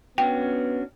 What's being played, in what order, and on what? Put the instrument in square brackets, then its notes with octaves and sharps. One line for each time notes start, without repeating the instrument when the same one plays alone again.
[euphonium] B3 [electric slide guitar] C#4 D4 F#4 [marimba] G5